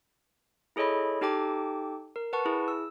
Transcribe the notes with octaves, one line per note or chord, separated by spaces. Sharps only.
E4 G#4 A4 C#5 D#5 B5
D#4 G4 A4 G5 A5 D6
A#4
B4 F#5 A5 C#6
E4 G#4
E6